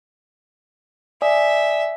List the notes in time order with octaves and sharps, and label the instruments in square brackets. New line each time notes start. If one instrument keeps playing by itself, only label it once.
[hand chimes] D5 G#5 D#6 [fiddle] E5